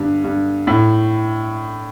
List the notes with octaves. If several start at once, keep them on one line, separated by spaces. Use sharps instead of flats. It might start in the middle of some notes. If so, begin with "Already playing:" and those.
Already playing: G2 D3
G2
A2